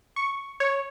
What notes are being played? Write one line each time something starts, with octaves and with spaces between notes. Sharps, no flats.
C#6
C#5